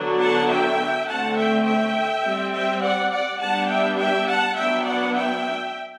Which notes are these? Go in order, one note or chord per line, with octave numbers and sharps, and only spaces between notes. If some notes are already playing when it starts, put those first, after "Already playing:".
Already playing: D3 F#3 B3 D4
F#5 A5
E5 G5
D3 A3 C4 F#5 A5
E5 G5
E5 G5
G3 C4
E5 G5
D5 F#5
D5 F#5
G3 B3 D4 F#5 A5
E5 G5
E5 G5
F#5 A5
F#3 B3 D4 E5 G5
D5 F#5
E5 G5